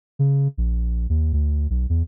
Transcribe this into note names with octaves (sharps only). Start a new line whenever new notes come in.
C#3
A#1
D#2
D2
B1
E2